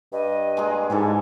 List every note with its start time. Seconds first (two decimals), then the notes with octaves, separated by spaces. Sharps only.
0.13 G2 D#5
0.57 G#3 A#3 G#4
0.90 G#2 E3 G4 A4 G#5